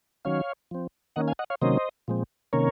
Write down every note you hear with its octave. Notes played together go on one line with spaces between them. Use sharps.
D#3 F#3 C#4 C#5 F5
F3 C4
D#3 A#3 C#4 D#5 F#5
F5 G#5
D#5 F#5
C#5 F5
C3 D#3 F#3 A#3 C#4 C5 D#5
A#2 F3 G#3 C4
C3 D#3 A#3 C#4 A#4 C#5